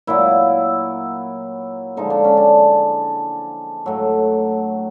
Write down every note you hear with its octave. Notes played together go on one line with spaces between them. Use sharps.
A#2 F#3 E4
D3 F3 G#3 D#4
D4
C#4
D4
A2 F#3